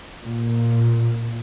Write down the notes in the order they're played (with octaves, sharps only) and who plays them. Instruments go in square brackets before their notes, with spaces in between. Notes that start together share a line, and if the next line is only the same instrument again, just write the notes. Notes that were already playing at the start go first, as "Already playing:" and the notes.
[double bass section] A#2